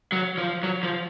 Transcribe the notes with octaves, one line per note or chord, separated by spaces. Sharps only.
F#3
F3
F#3
F3